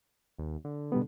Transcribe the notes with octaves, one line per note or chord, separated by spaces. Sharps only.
D#2
D3
B2 G3 B3